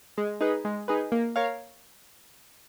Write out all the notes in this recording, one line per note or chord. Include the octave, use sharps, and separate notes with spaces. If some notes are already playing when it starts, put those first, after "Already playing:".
G#3
D#4 G#4 B4
G#3
D#4 G#4 B4
A#3
A#4 C#5 F5